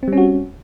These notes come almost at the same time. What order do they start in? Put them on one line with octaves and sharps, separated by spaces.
C4 G3 C#4 F#4